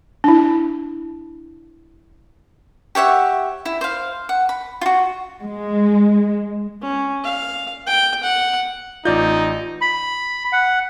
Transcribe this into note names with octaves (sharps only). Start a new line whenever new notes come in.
D4 E4
G4 C#5 E5 F#5
E4
C5 F5
F#5
B5
F4 F#4
G#3
C#4
F5
G5
F#5
A1 D#4 F4 D5 G6
B5
F#5